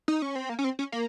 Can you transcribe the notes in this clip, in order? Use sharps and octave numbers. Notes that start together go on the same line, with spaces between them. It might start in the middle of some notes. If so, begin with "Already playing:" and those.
D#4
C#4
C4
A#3
C#4
C4
C#4
A#3